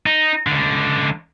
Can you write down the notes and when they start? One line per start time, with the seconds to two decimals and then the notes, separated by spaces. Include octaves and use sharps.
0.06 D#4
0.47 C#2 D3